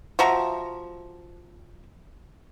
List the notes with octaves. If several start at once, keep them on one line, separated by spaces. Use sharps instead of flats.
F3 F#4 E5 A#5